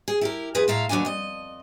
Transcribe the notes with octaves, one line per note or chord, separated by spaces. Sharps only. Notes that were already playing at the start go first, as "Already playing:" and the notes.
G#4
E4 G4 A#4
F2 G#4 B4
A2 G#3 E5 F5 A#5
D#2 F#3 B3 D4 G#5
F2 D#5